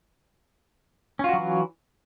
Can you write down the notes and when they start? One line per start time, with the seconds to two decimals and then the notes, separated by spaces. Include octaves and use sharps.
1.19 C#4
1.24 F4
1.29 F#4
1.33 F#3
1.38 E3